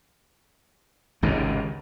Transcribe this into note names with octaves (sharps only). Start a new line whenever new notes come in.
G#1 C#2 G#2 C3